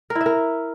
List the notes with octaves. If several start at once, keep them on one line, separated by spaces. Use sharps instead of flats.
A#4
E4
E5
A#4